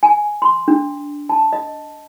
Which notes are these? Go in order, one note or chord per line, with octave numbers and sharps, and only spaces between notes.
G#5
C6
D4
A5
D#5